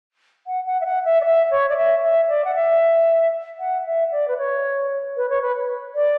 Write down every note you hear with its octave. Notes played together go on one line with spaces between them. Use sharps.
F#5
F#5
E5
F#5
E5
D5
E5
C#5
D5
E5
E5
D5
F#5
E5
F#5
E5
D5
B4
C#5
B4
C#5
B4
D5